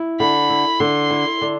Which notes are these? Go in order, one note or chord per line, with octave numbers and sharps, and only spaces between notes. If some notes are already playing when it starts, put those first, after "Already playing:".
Already playing: E4
D3 B5
E4
D3 C6
E4
D3